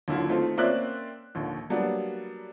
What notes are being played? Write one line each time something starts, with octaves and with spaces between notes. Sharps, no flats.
D#2 D3 F#3 E4 F4
D#3 A3 C4 F4
A#3 C4 C#4 D5 E5 F#6
A#1 D#2 D3
F#3 G3 A#3 B3 D4